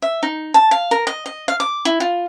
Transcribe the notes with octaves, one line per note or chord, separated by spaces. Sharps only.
E5
D#4
A5
F5
A#4
D#5
D#5
F5
D6
E4
F4